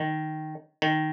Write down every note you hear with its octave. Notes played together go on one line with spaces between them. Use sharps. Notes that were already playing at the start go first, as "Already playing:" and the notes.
Already playing: D#3
D#3